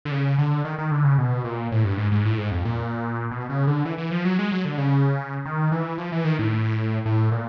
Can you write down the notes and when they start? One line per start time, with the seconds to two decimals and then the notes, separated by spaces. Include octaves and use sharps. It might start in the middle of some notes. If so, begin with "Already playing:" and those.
0.05 D3
0.12 C#3
0.38 D3
0.65 D#3
0.79 D#3
0.91 D3
1.04 C#3
1.18 B2
1.44 A#2
1.72 A2
1.85 G2
1.98 G#2
2.12 G#2
2.25 A2
2.38 G#2
2.51 F2
2.65 A#2
3.31 B2
3.49 C#3
3.67 D3
3.85 E3
3.98 E3
4.11 F3
4.25 F#3
4.39 G#3
4.52 F#3
4.65 D3
4.78 C#3
5.45 D#3
5.72 E3
5.98 F3
6.12 E3
6.25 D#3
6.39 A2
7.06 A2
7.32 A#2